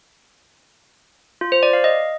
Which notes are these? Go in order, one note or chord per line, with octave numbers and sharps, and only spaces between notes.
F4
C5
D5
F5
D#5